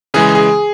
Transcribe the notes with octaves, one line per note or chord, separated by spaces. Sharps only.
C#3 E3 G#3 G#4
G#4